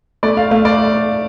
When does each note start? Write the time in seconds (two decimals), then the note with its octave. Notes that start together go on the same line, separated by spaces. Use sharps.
0.23 A3 D5
0.37 F5
0.51 A3 F5
0.65 D5